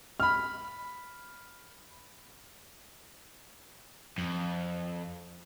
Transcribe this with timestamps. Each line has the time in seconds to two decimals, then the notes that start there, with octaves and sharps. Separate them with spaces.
0.20 B5 F6
4.18 F2